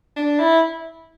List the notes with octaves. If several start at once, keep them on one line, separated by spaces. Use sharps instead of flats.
D4
E4